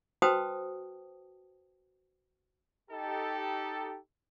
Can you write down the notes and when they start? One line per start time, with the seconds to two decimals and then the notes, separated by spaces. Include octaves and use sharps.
0.22 F#4 B4 C5 G5 A5 D#6
2.90 D#4 G4 A4